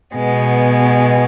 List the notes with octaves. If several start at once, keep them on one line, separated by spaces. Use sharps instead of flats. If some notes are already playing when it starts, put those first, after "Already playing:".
B2 G#3 B3